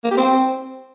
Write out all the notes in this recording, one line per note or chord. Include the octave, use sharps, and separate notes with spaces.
A#3
G4
C4